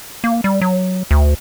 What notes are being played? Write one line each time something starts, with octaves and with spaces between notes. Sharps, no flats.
A#3
G3
F#3
D2